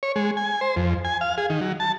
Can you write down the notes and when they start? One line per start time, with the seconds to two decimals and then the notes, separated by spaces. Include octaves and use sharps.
0.03 C#5
0.16 G#3
0.37 G#5
0.61 C5
0.76 F2
1.05 G#5
1.21 F5
1.38 G#4
1.50 D#3
1.61 F#3
1.80 A5